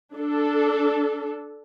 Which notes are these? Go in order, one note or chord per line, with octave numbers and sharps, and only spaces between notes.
D4 A4